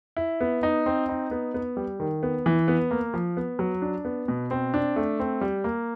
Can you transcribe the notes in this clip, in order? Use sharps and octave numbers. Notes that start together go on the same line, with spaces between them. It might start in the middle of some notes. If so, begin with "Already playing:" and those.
E4
B3
D#4
C4
D#4
B3
B3
G3
D#3
B3
E3
B3
A#3
F3
B3
F#3
D4
B3
B2
C4
D4
A3
C4
G3
A#3